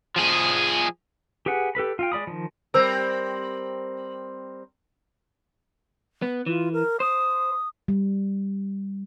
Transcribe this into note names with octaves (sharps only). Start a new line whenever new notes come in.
F3 G#4
G4 G#4 B4 F#5 G#5
G4 A4 B4 B5
F4 F5 G5
G#3 D5 B5 D#6
D#3 F3
G3 C4 A#4 C5 E6
B3
E3 F4
A#4
C5 D#6
G3